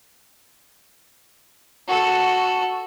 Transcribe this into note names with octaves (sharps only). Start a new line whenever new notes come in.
F#4 A4